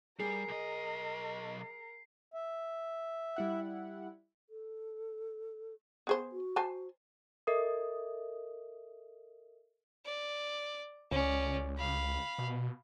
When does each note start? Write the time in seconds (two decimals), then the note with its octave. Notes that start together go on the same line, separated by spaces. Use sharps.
0.20 G3 G#4 A#4 C7
0.48 B1 D#5
2.34 E5
3.36 G3 E4 F#5
4.50 A4
6.07 B3 G#4 C5
6.32 F#4
6.56 C5 G#5 A5
7.47 A4 A#4 D#5 E5 D#6
10.05 D5
11.11 C#2 C#4 D5
11.78 F5 B5
12.38 B2